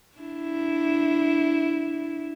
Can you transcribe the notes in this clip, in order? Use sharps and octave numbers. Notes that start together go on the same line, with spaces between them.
D4 E4